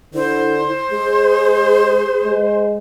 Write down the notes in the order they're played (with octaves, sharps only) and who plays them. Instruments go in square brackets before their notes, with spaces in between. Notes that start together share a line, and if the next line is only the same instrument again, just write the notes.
[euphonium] D3 [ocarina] E4 [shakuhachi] C5
[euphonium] G#3 [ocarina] G#4
[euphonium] G#3